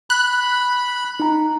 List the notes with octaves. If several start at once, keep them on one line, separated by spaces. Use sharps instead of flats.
B5 F#6
D#4 A#5